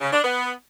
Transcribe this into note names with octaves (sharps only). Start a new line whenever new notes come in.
C#3
D4
B3